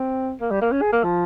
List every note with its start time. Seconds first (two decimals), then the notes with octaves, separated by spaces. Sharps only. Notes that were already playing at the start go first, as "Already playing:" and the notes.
Already playing: C4
0.41 A#3
0.51 G3
0.61 A#3
0.72 C#4
0.82 G#4
0.92 A#3
1.04 F3